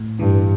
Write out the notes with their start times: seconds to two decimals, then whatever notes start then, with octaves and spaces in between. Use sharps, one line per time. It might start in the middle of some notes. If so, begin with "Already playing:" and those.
Already playing: A2
0.19 G2 E3